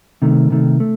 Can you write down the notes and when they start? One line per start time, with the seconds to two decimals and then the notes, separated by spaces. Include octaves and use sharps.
0.22 C3 D#3 A3
0.50 C3 D#3 A3
0.80 A3